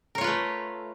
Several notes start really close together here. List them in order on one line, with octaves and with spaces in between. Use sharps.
A#4 C#5 F4 B4 A3